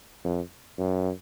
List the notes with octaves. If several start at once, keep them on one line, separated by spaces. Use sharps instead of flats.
F2
F#2